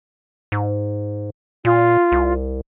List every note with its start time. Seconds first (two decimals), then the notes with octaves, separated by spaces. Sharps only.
0.52 G#2
1.65 A#2 F4
2.12 C2